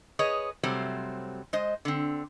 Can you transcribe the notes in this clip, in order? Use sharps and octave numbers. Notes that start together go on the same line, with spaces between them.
G#4 B4 C#5 D#5
C3 F#3 G3 A3 C4 C5
G#3 C5 D#5
D3 C4